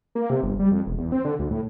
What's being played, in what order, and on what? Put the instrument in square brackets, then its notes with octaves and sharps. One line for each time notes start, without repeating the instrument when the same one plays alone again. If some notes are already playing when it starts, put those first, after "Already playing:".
[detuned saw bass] A#3
C3
G1
G3
F2
E1
E2
C4
D3
D2
A2